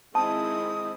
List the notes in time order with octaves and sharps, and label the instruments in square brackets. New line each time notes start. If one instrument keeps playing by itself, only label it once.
[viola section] D#3 C4 E4 [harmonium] G#3 [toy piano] A5 [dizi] D#6